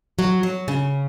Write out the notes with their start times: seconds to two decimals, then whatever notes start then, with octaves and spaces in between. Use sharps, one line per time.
0.19 F#3
0.43 F#3
0.68 C#3